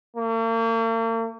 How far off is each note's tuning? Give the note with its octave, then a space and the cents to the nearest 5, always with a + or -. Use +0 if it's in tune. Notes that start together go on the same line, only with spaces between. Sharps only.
A#3 -45